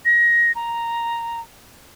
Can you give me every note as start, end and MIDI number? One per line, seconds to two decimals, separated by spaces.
0.05 0.52 94
0.55 1.40 82